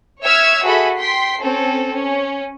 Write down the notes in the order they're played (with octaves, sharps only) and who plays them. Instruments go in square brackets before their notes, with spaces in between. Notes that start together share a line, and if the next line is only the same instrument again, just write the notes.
[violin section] C#5 E5 E6 F6 G#6
F#4 G#4 A4 E5 B5
G5 C6 B6 C7
C4 C#4 A4
C#4